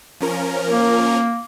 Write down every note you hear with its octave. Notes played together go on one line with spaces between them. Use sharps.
F3 C#4 A#4
A#3